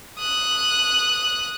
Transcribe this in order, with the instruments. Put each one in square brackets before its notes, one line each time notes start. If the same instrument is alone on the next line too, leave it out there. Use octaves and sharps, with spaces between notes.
[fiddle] D#6 F#6